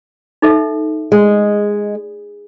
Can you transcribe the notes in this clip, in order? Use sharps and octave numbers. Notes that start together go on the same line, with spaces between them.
D#4 A4 E5
G#3